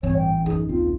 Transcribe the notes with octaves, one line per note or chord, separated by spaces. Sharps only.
A1 G2 E3 C4 C#5
G5
F#2 D#4 G#4
A#1 D#2 C4 F4